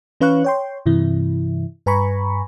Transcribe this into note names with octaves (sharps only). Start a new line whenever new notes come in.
E3 C#4 B4 F5 C#6 F#6
C#5 G5 C6
G2 C3 E3 E4
G2 B4 G#5 A#5 B5 C#6